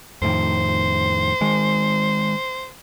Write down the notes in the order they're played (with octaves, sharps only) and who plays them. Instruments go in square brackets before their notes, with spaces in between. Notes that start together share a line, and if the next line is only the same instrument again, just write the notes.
[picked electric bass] F2 A2 D#3 [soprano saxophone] C5
[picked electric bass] D#3 G#3